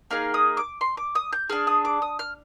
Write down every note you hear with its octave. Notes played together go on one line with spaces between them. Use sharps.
A#3 D#4 G#4 F5
D#6
D6
C6
D6
D#6
G6
D4 G#4 F6
D#6
D6
D#6
F6